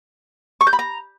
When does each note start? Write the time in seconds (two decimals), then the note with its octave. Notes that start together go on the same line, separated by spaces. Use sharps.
0.61 C#6
0.67 G6
0.73 B5
0.79 A#5